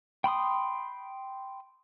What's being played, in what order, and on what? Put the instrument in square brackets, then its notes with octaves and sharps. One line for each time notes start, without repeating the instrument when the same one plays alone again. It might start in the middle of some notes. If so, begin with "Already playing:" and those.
[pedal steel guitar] G5 B5 C6 D#6